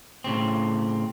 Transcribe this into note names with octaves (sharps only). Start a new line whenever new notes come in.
A2 C#3 C4